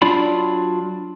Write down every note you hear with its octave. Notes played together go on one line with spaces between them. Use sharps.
F#3 D4 F4 D5 B5